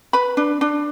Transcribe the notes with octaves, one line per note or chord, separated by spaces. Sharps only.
B4 B5
D4
D4